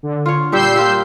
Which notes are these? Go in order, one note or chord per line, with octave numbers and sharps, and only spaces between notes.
D3
F4 C#5
A#2 G3 G4 E6 G6 C7
A#3 F4 G4